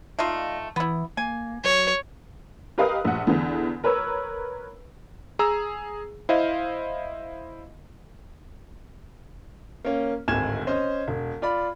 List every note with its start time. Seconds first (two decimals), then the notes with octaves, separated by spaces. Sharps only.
0.19 A3 D#4 F4 D5 D#5 F5
0.76 E3 B3 E4
1.17 A#3 G#5
1.64 F#3 C#5
2.78 G4 A#4 B4 D#5 F5 D#6
3.05 A#1 F#5
3.27 E2 D3 E3
3.84 A#4 B4 C#5 E6
5.39 G#4 A#5 E6
6.29 E4 C5 D#5 F5
9.85 A#3 C#4
10.28 D1 G#1 G#5 G#6 E7
10.67 C#4 C5 D#5
11.08 E1
11.42 F4 D5 B5